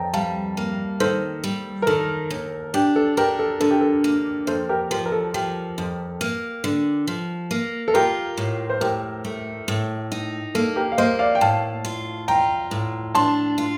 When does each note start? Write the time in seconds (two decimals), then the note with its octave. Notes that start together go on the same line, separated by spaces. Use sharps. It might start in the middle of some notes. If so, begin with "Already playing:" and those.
Already playing: F2 G5 A5 A#5
0.13 G3 F5 A5
0.57 A#3
1.00 D#3 A4 C5
1.44 G3
1.82 A#4
1.87 D#3 A4
2.30 D#2
2.74 D4 G4
2.96 A4
3.17 D4 G4 A#4
3.39 A4
3.60 D3 A4
3.70 G4
3.81 A4
4.04 A#3
4.47 F2 A4 C5
4.69 G4 A#4
4.90 F3 G4 A#4
5.06 A#4
5.12 A4
5.34 F3 G4
5.78 F2
6.21 A#3
6.64 D3
7.08 F3
7.51 A#3
7.88 A4
7.94 F4 G4 A#4
8.37 A2
8.70 C5
8.81 A2 G4 A#4
9.25 A3
9.68 A2
10.12 D#4
10.55 A#3 A4
10.76 G4 A#4
10.92 F5
10.98 A#3 C5 D#5
11.19 D5 F5
11.35 G5
11.41 A2 F5 A5
11.85 F4
12.28 F4 G5 A#5
12.71 A2
13.15 D4 A5 C6
13.58 F4